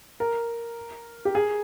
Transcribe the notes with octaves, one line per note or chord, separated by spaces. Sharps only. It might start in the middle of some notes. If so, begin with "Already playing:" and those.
A#4
G4
G#4